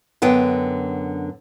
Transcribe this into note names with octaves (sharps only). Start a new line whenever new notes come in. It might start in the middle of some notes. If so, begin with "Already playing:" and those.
F#2 D3 B3 G5